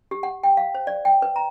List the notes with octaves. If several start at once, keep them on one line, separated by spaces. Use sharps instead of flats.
G4
F#5
G5
F5
C5
D5
G5
B4
A#5